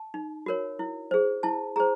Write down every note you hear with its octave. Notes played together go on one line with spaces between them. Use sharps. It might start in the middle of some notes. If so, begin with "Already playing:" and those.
Already playing: A5
D#4
F#4 A#4 C#5
E4
G#4 C5
E4 A5
G#4 C5 A#5